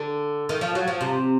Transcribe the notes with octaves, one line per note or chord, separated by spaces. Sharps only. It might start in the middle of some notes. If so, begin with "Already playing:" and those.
Already playing: D3
D#3
F3
F#3
F3
C3